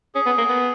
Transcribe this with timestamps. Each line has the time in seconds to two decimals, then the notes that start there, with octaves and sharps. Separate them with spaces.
0.15 C#4 G#4
0.26 B3
0.38 A#3
0.49 B3